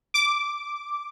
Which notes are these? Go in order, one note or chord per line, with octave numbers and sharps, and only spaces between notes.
D6